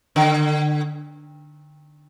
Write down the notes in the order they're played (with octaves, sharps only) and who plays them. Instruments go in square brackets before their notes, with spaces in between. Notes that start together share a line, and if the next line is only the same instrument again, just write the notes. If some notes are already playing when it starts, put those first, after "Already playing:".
[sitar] D3